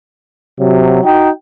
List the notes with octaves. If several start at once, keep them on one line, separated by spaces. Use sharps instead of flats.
C3 F#3
D#4 F#4 G5